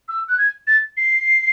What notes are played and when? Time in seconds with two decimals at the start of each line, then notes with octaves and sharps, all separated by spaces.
0.09 E6
0.29 F#6
0.38 G#6
0.67 A6
0.97 C7